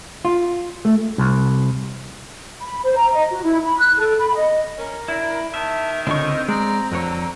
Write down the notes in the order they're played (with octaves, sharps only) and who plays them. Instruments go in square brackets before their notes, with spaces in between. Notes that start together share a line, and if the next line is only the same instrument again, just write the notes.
[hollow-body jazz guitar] F4
A3
[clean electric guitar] C2
[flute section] B5
C5
A#5
D#5
F#4
E4
B5
F#6
A4
B5
D#5
[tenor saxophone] C#4 [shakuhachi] A#4
[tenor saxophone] D4 [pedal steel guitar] E4
[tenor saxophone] D#3 [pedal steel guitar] E5 [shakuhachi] A5
[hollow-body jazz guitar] C#2 D3 C#5 [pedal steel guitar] C4 C#6 [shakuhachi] D#5
[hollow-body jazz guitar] G#3 [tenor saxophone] D5 [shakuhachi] A#5
[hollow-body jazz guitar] F2 C#5 [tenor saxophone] D3